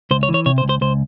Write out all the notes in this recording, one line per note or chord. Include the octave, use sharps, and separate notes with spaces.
C#2 C5
C#5
E3
C#5
C3 C#5
C5
C#2
C5
C#2 C5